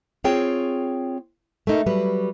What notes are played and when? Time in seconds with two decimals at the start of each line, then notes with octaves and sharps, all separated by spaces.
0.24 C4 F4 G#4 C#5 G5
1.67 A3 A#3 D#4
1.86 F#3 G3 B4